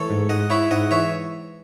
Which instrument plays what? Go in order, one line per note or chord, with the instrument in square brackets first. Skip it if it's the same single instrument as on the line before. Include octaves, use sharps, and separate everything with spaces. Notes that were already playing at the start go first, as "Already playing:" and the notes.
Already playing: [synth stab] E3 A3 [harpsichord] A4 C#5
[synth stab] G#2
[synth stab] G#2 [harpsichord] D#5 F#5
[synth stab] E4 [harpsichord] C#5 E5
[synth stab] G#2 [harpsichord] D#5 F#5
[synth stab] E3 [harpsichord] C#5 E5